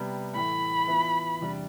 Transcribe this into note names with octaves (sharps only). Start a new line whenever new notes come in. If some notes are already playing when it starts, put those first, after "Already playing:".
Already playing: C3 G3 B3
A2 E3 A3 B5
E3 B3 F4 B4 E5
E2 C3 G3 D4